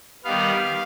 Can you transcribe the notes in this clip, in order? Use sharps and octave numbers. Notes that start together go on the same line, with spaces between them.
D#3 G3 B3 F5